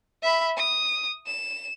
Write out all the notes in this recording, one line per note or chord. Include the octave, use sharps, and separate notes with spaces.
E5 B5
D#6
E7